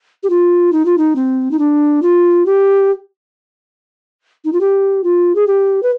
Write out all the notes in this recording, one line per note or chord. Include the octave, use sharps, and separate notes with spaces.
G4
F4
D#4
F4
D#4
C4
D#4
D4
F4
G4
D#4
F4
G4
F4
G#4
G4
B4